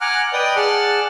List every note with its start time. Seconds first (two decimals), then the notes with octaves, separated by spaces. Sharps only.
0.01 F#5 G#5 A#5 D6 F6 F#6
0.33 B4 D5 D#5 G5 D#6
0.56 G#4 D5 F#5 A5 F6 F#6